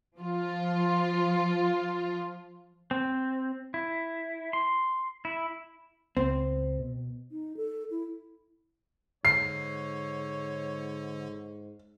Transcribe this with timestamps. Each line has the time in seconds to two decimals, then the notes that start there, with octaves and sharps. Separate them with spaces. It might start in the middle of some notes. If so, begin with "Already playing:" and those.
0.17 F3 F4
2.91 C4
3.74 E4
4.53 C6
5.25 E4
6.17 C#2 C4
6.79 B2
7.30 D#4
7.57 A4
7.91 E4
9.25 G#2 D3 C#5 C7